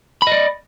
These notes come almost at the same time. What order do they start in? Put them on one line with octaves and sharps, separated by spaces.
B5 D#5 D5